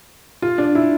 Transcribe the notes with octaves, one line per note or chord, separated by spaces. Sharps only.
F4
D4
E4